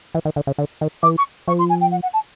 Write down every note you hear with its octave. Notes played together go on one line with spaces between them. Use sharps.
E3
D#3
D3
C#3
D3
D#3
E3 D6
C#6
F3 C#6
C6
G#5
G5
F#5
F#5
A5